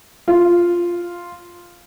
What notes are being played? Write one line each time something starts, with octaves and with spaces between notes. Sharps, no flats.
F4